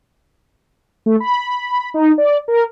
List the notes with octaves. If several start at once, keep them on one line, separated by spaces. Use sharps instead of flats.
A3
B5
D#4
D5
A#4